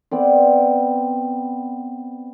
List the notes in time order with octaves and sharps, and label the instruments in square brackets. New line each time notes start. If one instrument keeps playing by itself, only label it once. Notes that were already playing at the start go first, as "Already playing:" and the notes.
[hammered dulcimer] B3 C4 D5